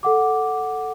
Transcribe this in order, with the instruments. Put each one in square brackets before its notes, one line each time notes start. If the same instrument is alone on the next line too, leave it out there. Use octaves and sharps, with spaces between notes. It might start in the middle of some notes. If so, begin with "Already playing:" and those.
[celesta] A4 F#5 D6